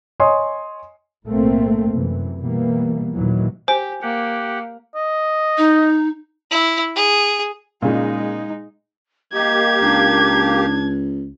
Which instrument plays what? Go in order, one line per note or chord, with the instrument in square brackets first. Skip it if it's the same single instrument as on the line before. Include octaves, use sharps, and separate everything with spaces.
[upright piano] C#5 D#5 G#5 C6 D#6
[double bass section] B1 A2 A3 A#3 C4
F#2 C3 E3
B2 E3 G3 A#3 B3
D#2 A#2 D#3 E3 F#3
[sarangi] G4 [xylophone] C5 [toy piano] G#5
[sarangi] A#3 [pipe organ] G4 F#5
[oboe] D#5
[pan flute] D#4
[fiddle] E4
G#4
[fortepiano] A#2 C#3 [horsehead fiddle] G#3 D#4
[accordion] A#3 G4 [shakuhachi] D#5 [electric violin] G#6
[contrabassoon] C#2 [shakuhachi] D4